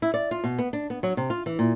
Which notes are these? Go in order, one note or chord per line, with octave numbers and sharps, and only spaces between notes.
E4
D5
F4
B2
B3
D4
B3
F#3
C3
F4
E3
A#2